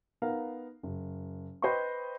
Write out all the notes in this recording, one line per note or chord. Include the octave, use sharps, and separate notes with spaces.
B3 D#4 A#4 F5
F#1
B4 C5 D#5 G5 B5 C#6